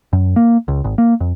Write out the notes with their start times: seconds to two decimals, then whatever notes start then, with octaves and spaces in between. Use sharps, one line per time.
0.13 F#2
0.36 A#3
0.68 C#2
0.84 G#1
0.98 A#3
1.20 F2